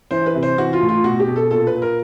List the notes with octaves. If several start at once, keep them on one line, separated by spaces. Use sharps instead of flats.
E3 C5
B4
C3
C5
E3 F#4
F4
A2
F4
B2 F#4
G4
B2
A4
A#2 A4
B4
A#2
A#4